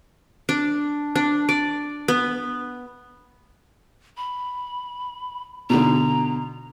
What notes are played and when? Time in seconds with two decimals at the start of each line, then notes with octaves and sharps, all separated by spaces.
0.49 D4
1.15 D4
1.49 D5
2.08 B3
4.17 B5
5.70 B2 D3 A#5